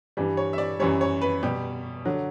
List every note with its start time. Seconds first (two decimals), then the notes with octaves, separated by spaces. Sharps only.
0.17 G2 E3 G3
0.37 C#5
0.53 E5
0.58 D5
0.80 F#2 E3 G3 C#5
1.01 C#5
1.22 B4
1.43 B2 G3 G4
2.05 D3 F#3